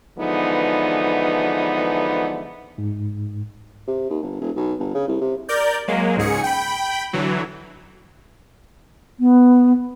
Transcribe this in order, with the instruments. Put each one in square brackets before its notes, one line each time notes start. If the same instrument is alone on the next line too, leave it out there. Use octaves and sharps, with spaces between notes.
[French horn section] D3 E3 F3 G#3 B3 D#4
[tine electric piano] G#2
[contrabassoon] C3
D#2
G1
E1
B1
G1
C#3
C2
C3
[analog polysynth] A#4 D5 G6
F#3 G#3 A#3
C#2 G#2 G#4 C#7
G5 B5
D3 E3 F#3
[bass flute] B3